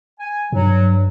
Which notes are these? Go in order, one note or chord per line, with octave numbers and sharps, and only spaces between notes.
G#5
G2 F#3